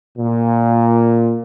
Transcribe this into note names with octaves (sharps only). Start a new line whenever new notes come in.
A#2